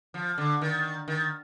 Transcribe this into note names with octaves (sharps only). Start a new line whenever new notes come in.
F3
D3
D#3
D#3